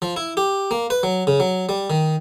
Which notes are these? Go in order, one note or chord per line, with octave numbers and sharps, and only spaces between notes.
F3
E4
G4
A#3
B4
F#3
C#3
F#3
G3
D#3